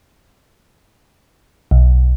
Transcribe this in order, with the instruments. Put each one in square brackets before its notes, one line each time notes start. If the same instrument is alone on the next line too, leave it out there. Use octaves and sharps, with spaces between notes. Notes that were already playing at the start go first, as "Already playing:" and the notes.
[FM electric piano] B1